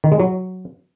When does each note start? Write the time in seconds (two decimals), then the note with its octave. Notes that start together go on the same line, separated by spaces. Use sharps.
0.04 D#3
0.12 G#3
0.20 F#3